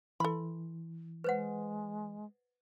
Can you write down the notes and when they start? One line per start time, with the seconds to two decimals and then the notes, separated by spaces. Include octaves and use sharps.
0.20 E3 A4 B5 C6
1.24 G#3 B4 C5 F#5